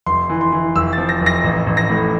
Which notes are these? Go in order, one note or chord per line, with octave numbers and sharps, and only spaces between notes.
F1 C6
E3
C6
E3
F1 E6
A6
F3
A#6
F1
A#6
A1
A1
A#6
A2